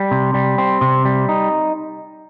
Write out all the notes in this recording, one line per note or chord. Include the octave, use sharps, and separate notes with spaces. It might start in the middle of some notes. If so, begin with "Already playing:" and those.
Already playing: G3
C3
G3
C4
C3
G3
D#4